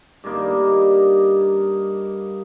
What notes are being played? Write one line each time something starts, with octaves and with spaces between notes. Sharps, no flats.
G2 D#3 A#3 D#4